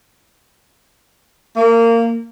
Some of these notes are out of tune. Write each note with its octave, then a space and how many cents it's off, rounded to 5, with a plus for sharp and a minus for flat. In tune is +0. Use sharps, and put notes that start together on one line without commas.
A#3 -20